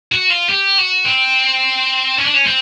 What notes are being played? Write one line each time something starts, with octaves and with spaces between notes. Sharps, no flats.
F#4
F4
G4
F#4
C4
C#4
D4
C#4
C4